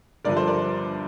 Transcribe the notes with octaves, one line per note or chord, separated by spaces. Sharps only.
G1 G2 D3 F3 A#4 D5
A4 C5
A#4 D5